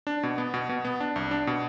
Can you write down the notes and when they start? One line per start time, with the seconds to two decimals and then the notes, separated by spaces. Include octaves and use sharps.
0.07 D4
0.23 B2
0.38 B3
0.54 B2
0.69 B2
0.85 B3
1.00 D4
1.16 C2
1.31 D4
1.47 B2